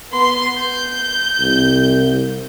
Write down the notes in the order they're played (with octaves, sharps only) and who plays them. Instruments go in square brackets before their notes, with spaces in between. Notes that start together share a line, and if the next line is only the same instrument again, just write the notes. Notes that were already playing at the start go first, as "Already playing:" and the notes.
[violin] B3 C6
G6
[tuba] C2